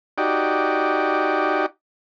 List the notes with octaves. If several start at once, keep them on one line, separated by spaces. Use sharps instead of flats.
D#4 F#4 G4 D5